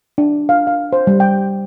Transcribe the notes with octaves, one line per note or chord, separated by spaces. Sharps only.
D4
F5
F5
C5
G3
G5